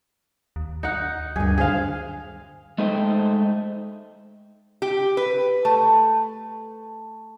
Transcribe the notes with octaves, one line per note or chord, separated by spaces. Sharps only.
D#2
D#4 F#5
D2 G2 G#4 A#4
D3 D#3 G#4 C5 F5
G#3 A3 D#4 C5 D#5 G5
G4
B4
A3